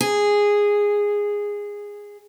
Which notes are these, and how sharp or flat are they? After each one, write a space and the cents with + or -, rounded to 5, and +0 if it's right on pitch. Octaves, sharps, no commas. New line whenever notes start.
G#4 -10